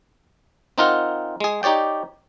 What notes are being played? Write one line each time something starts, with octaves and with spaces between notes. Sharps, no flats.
C4 D#4 F4 A#4 F#5
G#3 G#4
D#4 G4 C#5 D5 G5